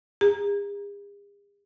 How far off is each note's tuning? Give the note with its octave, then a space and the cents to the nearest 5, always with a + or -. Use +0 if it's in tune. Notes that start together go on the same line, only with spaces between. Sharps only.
G#4 -45 A#5 +0